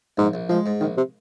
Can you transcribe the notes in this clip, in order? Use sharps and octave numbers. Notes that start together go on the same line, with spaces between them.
A#1 G#2
A#1
F3 G#3
G#2
A#1 D#3
C3